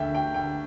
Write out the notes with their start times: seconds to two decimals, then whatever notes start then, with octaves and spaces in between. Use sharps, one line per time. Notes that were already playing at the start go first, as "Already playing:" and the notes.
Already playing: D2 A3 E5 G5
0.15 G5
0.34 D2 G5